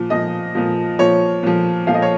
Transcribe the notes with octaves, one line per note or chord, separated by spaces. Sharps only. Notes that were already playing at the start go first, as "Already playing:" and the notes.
Already playing: A#2 F3
A#2 F3 D#5
A#2 F3
A#2 F3 C#5
A#2 F3
A#2 F3 F5
D#5
C#5